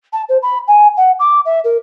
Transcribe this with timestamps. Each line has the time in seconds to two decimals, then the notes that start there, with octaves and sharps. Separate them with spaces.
0.13 A5
0.29 C5
0.42 B5
0.68 G#5
0.97 F#5
1.19 D6
1.45 E5
1.64 A#4